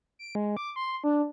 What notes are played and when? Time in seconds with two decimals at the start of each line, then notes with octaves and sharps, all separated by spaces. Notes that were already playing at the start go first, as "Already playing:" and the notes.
0.19 D7
0.35 G#3
0.57 D6
0.76 C6
1.04 D4